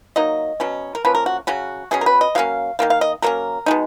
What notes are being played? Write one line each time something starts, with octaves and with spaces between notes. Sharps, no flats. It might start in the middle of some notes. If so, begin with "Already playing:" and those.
F#3 A#3 D#4 D#5
B2 F#3 C#4
A#4
F3 A#3 C#4 B4
A#4
F#4
C#3 F#3 C#4 F#4
B2 F#3 C#4 G#4
A#4
B4
D#5
F#3 A#3 C#4 F5
D#3 F#3 A#3 F5
F5
D#5
F#3 A#3 C#4 A#4
B2 G#3 D#4